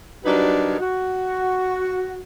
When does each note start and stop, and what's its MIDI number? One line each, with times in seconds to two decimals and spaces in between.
0.25 0.76 54
0.25 0.76 55
0.25 0.76 62
0.25 0.76 63
0.25 0.76 70
0.25 0.76 71
0.79 2.22 66